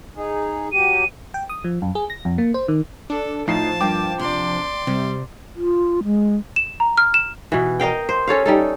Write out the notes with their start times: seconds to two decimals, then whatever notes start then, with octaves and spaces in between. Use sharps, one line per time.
0.16 D#4 G#4
0.72 F#3 G4 D#7
1.34 G5
1.49 D#6
1.64 F3
1.82 F#2
1.95 G#4
2.10 A#6
2.25 F2
2.38 A#3
2.54 C5
2.68 D#3
3.10 D4 A4
3.48 A2 F3 D#4 A5 C7
3.81 G2 A#3 F4 G5 D6
4.19 C3 D4 D5 C6
4.87 C3 G3
5.56 F4
6.04 G#3
6.56 E7
6.80 A#5
6.98 F6
7.14 E7
7.52 B2 E3
7.80 A#4 D#5 F5 G5
8.09 C5
8.27 C#4 A4 C#5 F5
8.46 G3 D#4 A4